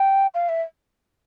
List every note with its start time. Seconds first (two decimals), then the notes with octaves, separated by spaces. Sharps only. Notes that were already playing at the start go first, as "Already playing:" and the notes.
Already playing: G5
0.34 F5
0.49 E5